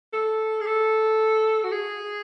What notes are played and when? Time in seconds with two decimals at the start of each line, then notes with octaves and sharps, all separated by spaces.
0.13 A4
0.60 G#4
0.67 A4
1.64 F#4
1.72 G#4